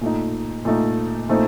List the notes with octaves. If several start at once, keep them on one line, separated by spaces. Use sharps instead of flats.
A#2 A3 D#4
A#2 A3 D#4
A#2 A3 C4 D#4